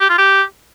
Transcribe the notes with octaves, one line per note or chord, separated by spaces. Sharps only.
G4
F4
G4